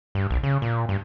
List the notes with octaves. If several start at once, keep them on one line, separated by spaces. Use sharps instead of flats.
G2
B1
C#3
A#2
G2